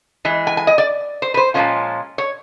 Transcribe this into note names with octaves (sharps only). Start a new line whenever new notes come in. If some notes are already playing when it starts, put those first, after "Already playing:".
E3 G#3
G#5
G#5
D#5
D5
C5
B4
C5
A#2 F3 G#3 C#4 F4
C#5